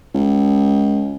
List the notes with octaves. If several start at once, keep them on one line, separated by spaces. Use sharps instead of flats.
C#2